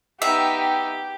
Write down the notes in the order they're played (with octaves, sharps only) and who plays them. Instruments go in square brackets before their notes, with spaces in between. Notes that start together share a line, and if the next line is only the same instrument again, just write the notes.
[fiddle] B3 D#4 [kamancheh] G4 [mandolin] E5 [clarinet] G5